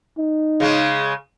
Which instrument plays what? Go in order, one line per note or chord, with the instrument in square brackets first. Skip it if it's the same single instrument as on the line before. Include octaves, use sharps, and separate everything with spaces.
[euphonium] D#4
[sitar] C#3 G#3